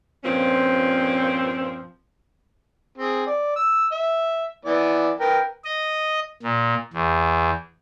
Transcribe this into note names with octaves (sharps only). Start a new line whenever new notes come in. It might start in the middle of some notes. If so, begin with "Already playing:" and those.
G2 A#2 F3 C4 C#4
C4 G#4
D5
E6
E5
E3 B3 D5
A#4 B4 G5
D#5
A#2
E2